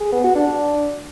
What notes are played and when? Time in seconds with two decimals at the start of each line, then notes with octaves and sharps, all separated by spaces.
0.01 G#4
0.12 B3
0.24 F#4
0.35 D4